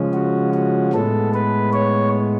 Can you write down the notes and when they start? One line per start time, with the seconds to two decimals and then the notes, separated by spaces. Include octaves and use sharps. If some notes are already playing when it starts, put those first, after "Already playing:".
Already playing: C#3 F3 G#3 C#4
0.14 F#4
0.54 F#4
0.93 A2 G#3 B3 A4
1.34 B4
1.73 C#5